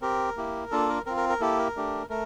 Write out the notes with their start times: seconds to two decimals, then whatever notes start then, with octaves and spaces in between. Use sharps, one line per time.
0.02 C4 G4 A#4
0.37 A#3 E4 G4
0.71 A#3 D4 F4 A4
0.89 A#4
1.06 C4 F4 A#4
1.17 A#4
1.29 A#4
1.40 A#3 E4 G4 A4
1.59 A#4
1.76 A3 D4 G4
2.10 A3 A#4